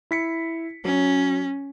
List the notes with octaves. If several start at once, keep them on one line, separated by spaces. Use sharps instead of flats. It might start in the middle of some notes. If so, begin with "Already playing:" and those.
E4 B6 C#7
F#3 C#4